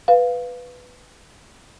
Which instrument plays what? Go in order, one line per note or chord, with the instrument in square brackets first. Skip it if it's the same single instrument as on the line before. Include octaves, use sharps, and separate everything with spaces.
[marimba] B4 F5